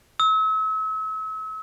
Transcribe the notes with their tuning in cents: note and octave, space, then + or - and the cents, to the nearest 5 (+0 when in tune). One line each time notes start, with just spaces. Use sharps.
E6 -40